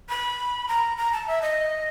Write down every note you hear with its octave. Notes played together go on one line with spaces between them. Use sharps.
B5
A#5
A#5
A5
E5
D#5